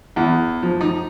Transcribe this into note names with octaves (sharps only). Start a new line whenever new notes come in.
E2
F3
D#4